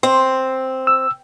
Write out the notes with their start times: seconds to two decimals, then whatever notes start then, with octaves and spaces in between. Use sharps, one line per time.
0.03 C4 C6
0.87 E6